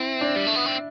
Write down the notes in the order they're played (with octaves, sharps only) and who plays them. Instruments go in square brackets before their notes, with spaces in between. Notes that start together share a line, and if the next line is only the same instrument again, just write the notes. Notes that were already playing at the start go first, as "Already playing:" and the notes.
Already playing: [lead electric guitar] C4 [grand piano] E4
[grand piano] D4
[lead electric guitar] G3
A3
B3
C4